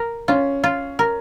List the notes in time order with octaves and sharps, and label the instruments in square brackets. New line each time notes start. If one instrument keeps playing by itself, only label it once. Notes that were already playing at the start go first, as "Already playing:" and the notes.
Already playing: [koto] A#4
[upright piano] C#4 [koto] F4
[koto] F4
A#4